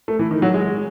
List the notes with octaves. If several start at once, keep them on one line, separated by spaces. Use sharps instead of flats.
A3
E3
D#3
F#3
G#3